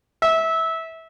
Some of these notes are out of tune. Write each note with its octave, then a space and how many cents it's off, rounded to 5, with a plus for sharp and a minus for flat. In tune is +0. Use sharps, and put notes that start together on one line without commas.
E5 -20